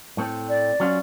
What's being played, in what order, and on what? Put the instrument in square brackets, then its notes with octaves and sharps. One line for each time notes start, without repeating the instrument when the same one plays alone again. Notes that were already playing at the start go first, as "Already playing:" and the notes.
[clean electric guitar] A2 A3 C4
[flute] D5
[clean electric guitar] F#3 C#4 F4